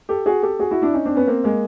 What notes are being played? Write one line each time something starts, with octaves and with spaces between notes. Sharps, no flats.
G4 A4
F#4 G#4
G4 A4
F#4 G#4
E4 F#4
D4 E4
C#4 D#4
C4 D4
B3 C#4
A#3 C4
G#3 A#3